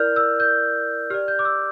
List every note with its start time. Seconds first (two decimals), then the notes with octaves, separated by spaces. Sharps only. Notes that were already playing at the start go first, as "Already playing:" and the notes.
Already playing: E4 A#4 D5 F6 G6
0.16 E6
0.40 G6
1.10 G4 D5 F6
1.28 G6
1.39 D6
1.45 E6